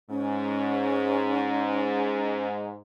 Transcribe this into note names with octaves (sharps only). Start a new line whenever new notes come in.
G#2 C#4